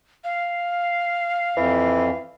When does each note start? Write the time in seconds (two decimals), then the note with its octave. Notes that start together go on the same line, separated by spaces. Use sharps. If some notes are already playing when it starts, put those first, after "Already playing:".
0.24 F5
1.57 F2 E3